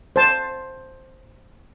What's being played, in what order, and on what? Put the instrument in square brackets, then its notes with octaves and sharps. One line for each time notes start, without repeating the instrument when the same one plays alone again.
[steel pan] C5 A5